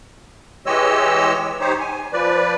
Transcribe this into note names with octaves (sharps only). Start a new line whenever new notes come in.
E3 G#3 G4 C#5 D#5 E6
D#4 G4 C5 C#5
G#5
F3 B4 D5